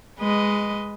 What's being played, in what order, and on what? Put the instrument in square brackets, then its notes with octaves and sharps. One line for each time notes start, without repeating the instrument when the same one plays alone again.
[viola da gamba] G#3 B4 D#5